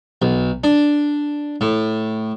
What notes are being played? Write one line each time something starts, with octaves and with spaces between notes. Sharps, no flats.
B1
D4
A2